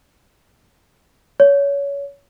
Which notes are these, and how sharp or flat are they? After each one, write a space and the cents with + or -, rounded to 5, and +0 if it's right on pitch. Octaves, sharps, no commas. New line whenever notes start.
C#5 +25